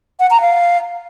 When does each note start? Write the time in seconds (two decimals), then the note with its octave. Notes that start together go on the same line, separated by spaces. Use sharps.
0.20 F#5
0.31 A#5
0.41 F5